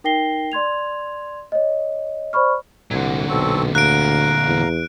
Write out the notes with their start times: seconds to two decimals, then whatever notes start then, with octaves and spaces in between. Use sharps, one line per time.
0.04 D#4 A#4 G5 A#6 C7 G7
0.52 D5 C6 G#6 F7
1.52 C#5 D#5
2.33 C5 D5 B5 C#6 F6
2.91 C2 A#2 D3
3.29 B1 C4 A4 C#6
3.75 D2 F5 A#5 F#6 D7
4.47 E2